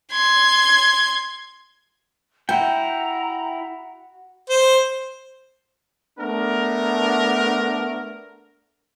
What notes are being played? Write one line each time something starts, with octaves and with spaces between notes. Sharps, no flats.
C6 G#6
E4 F#4 G5 A#5
C5
A3 B3 D4 A#4